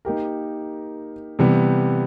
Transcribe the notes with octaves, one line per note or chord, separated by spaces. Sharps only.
A#3 D#4 G4 A#4
C3 E3 G3 B3